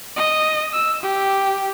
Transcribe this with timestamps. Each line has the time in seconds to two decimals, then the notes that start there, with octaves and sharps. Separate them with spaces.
0.16 D#5
0.73 E6
1.02 G4